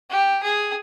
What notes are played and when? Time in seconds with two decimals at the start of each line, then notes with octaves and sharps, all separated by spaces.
0.10 G4
0.44 G#4